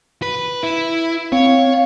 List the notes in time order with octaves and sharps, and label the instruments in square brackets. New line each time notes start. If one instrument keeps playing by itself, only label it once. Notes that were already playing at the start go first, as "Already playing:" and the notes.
[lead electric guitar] B4
E4
[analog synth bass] C4 [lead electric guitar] C#5 [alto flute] F5